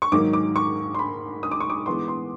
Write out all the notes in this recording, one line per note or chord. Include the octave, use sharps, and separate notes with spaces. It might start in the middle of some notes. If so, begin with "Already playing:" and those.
C#6
G#2 D#3 F#3 A#3 D#4 D6
D6
C#6
C6
B5
D#6
D6
C#6
D6
E3 G#3 B3 E4 C6
C6